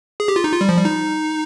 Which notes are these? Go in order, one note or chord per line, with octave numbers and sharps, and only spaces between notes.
G#4
G4
F4
D#4
F4
G3
F3
G3
D#4